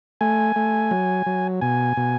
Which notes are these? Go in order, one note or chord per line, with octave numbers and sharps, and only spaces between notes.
A3 G#5
A3
F#3
F#3
B2 G#5
B2